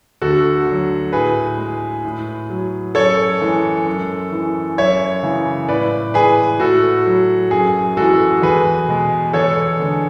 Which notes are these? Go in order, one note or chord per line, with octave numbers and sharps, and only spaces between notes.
D2 F#4 A4
D3 F#3
A2 G#4 B4
G#3
A2
F#3
F#2 A4 C#5
E3 G#3
F#2
E3 G#3
F#2 C#5 E5
C#3 E3 G#3
A2 B4 D5
E3 G#3 G#4 B4
A2 F#4 A4
F#3
F#2 G#4
E3 G#3 F#4 A4
E2 G#4 B4
B2 G#3
E2 A4 C#5
D3 G#3